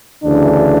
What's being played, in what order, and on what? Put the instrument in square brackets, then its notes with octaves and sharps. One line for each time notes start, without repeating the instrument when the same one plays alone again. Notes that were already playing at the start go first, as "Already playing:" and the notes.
[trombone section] D2 C#3 E3 D4